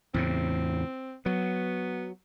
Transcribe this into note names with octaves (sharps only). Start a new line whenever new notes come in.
E2 A2 C#3 C4
F#3 B3